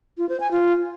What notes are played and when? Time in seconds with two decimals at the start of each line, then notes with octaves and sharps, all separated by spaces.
0.18 F4
0.29 C5
0.40 G#5
0.51 F4